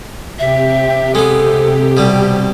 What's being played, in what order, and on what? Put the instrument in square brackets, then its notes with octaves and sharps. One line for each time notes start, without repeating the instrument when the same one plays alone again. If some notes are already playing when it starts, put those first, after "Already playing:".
[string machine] C3 G4 [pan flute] E5
[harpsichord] G#3 B3 [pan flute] A4
[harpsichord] B2 G3